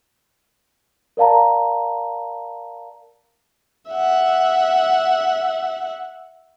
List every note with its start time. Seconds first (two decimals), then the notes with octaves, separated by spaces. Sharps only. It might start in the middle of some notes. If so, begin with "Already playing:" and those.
1.17 A#4 D5 F5 A5 A#5
3.91 E5 F#5